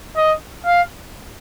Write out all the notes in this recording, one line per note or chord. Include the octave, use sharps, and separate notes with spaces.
D#5
F5